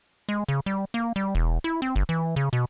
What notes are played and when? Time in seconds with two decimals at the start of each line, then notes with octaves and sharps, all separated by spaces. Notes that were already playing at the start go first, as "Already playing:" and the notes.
0.29 G#3
0.48 C#3
0.66 G3
0.94 A#3
1.16 G3
1.35 E1
1.64 E4
1.82 C4
1.96 G1
2.09 E3
2.36 C#3
2.53 B2